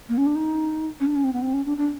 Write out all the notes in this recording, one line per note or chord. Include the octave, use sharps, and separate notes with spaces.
A#3
C#4
D4
D#4
C#4
D4
C#4
C4
B3
C4
C#4
D4
D4